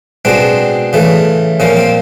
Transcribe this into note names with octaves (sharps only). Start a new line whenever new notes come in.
B2 G#3 C4 D4
C#3 E3 A3
A#2 F3 A#3 C#4
C4